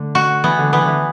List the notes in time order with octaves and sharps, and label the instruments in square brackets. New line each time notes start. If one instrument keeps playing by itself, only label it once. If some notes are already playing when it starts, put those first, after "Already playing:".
Already playing: [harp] D3 A3
[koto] F#4
[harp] E3 [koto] B3
[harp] D3
[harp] E3 [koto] B3
[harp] D3
E3